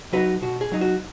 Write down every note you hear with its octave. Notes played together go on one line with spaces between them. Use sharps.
F#3 D#4 F#4 B4
B2 F#4
G#4
F#3 D#4
F#4